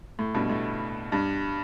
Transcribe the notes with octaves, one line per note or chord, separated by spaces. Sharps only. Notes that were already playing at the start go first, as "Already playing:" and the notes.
A2
G2 B2
A2
G2